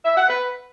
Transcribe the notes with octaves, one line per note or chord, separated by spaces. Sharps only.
E5
F#5
B4